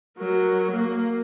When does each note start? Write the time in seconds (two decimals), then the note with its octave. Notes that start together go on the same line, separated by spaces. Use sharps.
0.18 F#3 A#4
0.72 A#3